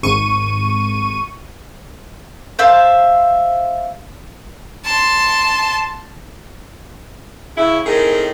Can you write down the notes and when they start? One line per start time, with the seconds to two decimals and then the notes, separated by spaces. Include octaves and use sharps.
0.03 G#1 C#6 D#7
2.59 C5 E5 F5 A5
4.85 A5 C6
7.57 C#3 E4
7.86 A2 D#3 C4 G#4 A#4 D#5